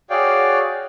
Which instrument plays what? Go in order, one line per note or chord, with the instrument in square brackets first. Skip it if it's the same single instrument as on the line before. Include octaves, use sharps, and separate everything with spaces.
[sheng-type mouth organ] F#4 G#4 C#5 D5 F5 G5